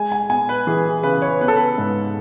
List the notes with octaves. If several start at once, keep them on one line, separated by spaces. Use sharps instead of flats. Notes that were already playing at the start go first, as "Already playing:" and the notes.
Already playing: G#3 G#5
G#5
B3 G#5
B4
E3 G#4
G#4
C#3 B4
C#5
B3 B4
A4
B4
G#2